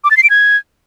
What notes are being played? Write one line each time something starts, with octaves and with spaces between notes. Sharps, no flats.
D6
A6
C7
D7
G#6